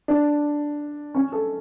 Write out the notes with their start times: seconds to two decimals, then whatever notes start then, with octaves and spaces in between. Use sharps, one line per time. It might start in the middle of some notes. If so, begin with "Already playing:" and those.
0.08 D4
1.15 C#4
1.32 A4